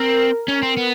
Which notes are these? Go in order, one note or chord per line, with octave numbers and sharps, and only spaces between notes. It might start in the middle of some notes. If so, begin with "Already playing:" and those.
Already playing: C4 A#4
C#4
C4
B3